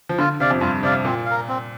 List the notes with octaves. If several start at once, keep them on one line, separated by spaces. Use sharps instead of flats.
F3
D3 F4
C3 D5 F5
F2
G2 F4
C3 D5 F5
A#2 C4
A#4 F5
C4